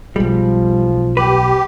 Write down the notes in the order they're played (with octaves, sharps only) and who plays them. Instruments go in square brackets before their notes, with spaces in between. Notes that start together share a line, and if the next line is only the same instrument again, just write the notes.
[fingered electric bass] B1 G#3 [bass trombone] F3 [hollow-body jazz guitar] G3
[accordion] G4 [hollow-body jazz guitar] B4